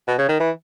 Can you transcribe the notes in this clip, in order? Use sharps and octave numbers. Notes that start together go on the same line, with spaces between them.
B2
C#3
D#3
E3